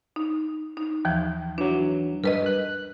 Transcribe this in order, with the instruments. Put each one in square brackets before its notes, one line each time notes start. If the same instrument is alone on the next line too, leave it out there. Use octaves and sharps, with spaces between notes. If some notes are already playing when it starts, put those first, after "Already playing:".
[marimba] D#4
D#4
D#2 E3 F3
[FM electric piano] E3 F#3 [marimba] D4
[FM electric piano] G2 [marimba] A#4 B4 D#5
[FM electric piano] F#6